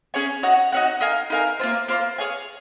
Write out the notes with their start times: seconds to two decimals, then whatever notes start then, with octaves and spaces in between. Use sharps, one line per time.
0.14 C#4 G#4 C#5 G#5
0.43 D#4 F#4 C#5 F#5
0.72 D#4 F#4 C#5 F#5
1.01 D#4 A#4 F5 G#5
1.30 D#4 A#4 F5 G#5
1.59 A#3 F4 C5
1.88 A#3 F4 C5
2.18 G#4 C#5 F5 G#5